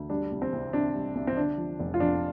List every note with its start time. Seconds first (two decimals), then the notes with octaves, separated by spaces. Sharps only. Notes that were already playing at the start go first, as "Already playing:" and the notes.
Already playing: D2
0.10 G3 D4
0.32 C2
0.42 C4
0.52 C2
0.73 C3 D4
0.95 G3
1.15 C2
1.27 C4
1.37 D3 D4
1.58 F3
1.79 F1
1.94 F4
2.00 F2 D4